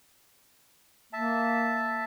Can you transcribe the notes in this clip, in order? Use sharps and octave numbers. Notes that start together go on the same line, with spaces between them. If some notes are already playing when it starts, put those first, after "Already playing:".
A#3 E5 A5